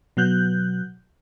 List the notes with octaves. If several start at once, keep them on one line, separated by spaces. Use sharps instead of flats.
B2 F#3 F#6 G6